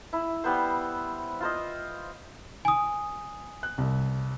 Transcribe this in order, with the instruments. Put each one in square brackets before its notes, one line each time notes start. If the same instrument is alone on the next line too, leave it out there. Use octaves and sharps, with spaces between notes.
[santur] E4
G3 B3 C5
F4 C5 D#5
[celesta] G#5 D#6
[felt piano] F#6
C2